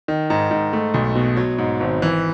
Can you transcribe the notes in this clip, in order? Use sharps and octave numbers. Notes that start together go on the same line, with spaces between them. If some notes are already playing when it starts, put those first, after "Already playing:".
D#3
G#2
G#2
A3
B1
B2
F#3
G#2
G#1
E3